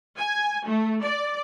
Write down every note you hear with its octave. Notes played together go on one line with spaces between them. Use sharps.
G#5
A3
D5